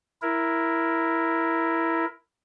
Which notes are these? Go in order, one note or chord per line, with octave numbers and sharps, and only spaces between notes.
E4 A#4